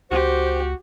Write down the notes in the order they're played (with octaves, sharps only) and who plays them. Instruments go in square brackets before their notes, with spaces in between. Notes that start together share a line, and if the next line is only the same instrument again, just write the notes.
[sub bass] C#2 [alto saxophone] F#4 [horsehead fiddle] G4 [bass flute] C5